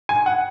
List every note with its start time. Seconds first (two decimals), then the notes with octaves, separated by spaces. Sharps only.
0.09 G#5
0.26 F#5